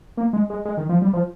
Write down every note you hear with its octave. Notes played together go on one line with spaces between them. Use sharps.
A#3
G#3
G#3
G#3
D#3
F3
G3
F3